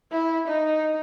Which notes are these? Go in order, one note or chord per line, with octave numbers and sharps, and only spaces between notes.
E4
D#4